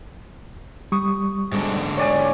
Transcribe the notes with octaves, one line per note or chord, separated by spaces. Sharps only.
G3 C#6 D#6
G#2 D3
C#5 D5 G#5